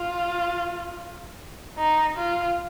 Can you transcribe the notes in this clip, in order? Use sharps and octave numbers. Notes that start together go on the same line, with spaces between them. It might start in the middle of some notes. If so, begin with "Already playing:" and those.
Already playing: F4
D#4
F4